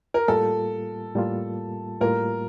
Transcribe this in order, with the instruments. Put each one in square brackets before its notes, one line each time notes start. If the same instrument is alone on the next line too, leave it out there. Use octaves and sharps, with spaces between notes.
[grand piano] A#4
[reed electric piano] A2 G3 A#3 F4 [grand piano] A4
[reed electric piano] A2 G3 A#3 F4
[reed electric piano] A2 G3 A#3 F4 [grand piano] A#4